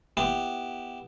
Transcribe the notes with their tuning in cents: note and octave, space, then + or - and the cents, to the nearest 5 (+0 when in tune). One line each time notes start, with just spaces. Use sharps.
B3 +0 E4 +0 G4 +0